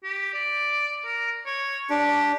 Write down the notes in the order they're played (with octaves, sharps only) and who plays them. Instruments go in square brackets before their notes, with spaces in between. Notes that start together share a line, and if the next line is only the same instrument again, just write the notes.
[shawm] G4
D5
A#4
C#5
[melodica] D4 [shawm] G4